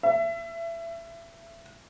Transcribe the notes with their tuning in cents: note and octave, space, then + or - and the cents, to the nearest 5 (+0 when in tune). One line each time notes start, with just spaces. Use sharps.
E5 +25